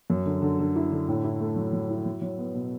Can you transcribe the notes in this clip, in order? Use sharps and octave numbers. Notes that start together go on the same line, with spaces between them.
F#2
D3
D3
D3
E4
D3
A2
E4
A3
F#3
F#3
E4
F#3
F#3
B3
B2